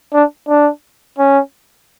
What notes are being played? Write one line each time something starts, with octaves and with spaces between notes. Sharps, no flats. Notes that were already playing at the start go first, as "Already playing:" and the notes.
D4
D4
C#4